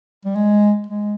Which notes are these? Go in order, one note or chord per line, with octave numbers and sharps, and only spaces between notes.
G3
G#3
G#3